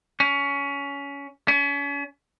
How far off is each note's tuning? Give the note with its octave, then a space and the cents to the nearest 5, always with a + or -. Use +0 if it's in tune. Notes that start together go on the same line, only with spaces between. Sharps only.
C#4 +20
C#4 +40